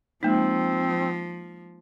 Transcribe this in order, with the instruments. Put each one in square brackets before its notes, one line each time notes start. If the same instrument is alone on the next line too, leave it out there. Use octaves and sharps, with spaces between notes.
[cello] F3 [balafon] G#3 A#3 D#4 [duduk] C4